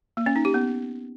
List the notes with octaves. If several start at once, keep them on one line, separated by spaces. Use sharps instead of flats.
A#3
C#4
D#4
G4
B3